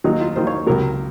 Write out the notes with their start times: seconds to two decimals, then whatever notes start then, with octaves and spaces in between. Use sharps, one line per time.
0.04 D#2 D#3 F#3 D#4
0.21 F4
0.36 D#2 D#3 F#3 C5
0.47 C#5
0.67 C#2 C3 F#3 A#4